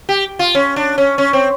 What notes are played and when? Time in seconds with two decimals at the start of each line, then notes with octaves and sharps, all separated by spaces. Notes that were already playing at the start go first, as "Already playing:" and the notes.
0.09 G4
0.39 F4
0.55 C#4
0.76 D4
0.98 C#4
1.18 C#4
1.33 C4